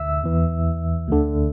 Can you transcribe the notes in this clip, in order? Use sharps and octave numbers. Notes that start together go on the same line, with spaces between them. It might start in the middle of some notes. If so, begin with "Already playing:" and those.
Already playing: D2 D3 E5 E6
E2 E3
D2 D3